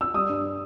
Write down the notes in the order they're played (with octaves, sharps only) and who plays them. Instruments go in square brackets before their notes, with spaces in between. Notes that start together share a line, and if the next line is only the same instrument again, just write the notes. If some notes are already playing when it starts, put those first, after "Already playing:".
[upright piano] E6
G3 D#6
G2